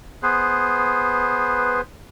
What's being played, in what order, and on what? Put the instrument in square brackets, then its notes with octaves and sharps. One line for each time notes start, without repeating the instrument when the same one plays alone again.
[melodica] B3 G#4 B4 C5